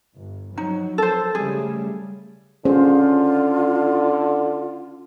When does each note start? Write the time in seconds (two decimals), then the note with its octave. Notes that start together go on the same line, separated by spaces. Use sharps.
0.16 G1
0.57 F3 F#3 D#4
0.98 A4 C5
1.35 C#3 G3 A3 G#4
2.65 D3 C#4 F4 G#4 C5